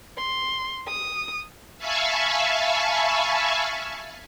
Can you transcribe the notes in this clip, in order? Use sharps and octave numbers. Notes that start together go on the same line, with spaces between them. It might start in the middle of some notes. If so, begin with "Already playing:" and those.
C6
D#6
E5 F5 G#5 A5 B5 C#6